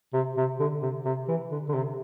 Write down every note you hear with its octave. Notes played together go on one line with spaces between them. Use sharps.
C3
C3
D3
C3
C3
E3
D3
D3
C3